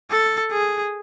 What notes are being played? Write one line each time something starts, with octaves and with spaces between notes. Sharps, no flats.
A4
G#4